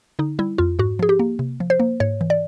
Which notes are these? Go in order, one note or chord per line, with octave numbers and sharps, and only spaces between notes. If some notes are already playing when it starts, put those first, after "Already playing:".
D3 D#4
G3 E4
F2 F4
G#2 F#4
F3 G#4
G4
A#3
C3
F3
C5
A#3
G#2 C#5
E3
D5